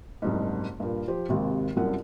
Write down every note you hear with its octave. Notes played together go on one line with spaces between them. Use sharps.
F#1 C2 G#2
G2 A#2
F3 G4 C5
G#1 D#2 C3
G1 C2 F#2 F4 F#5